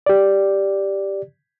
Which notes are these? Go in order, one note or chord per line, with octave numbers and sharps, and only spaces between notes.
G4 D5